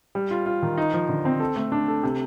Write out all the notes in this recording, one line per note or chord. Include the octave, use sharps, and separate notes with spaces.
G3
F4
F4
D#3
D#4
F3
D3
C4
A4
A3
D4
A4
C3